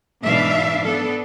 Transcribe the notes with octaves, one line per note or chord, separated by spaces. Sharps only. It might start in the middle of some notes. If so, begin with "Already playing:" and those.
G#2 B2 E3 D4 E5 F5
B3 D4 A4